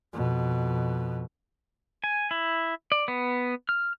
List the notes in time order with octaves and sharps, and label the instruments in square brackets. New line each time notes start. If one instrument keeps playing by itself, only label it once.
[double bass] F2 B2
[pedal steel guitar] G#5
E4
D5
B3
F6